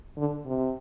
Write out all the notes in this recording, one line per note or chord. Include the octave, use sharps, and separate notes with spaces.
D3
C3